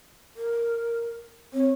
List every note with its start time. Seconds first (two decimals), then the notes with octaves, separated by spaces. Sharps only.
0.36 A#4
1.53 C4 C#5